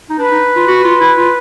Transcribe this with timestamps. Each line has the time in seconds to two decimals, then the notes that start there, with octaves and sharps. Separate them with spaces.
0.10 D#4
0.18 D4 B4
0.31 D#4
0.56 F4
0.68 F#4
0.84 F4
1.01 E4
1.17 F4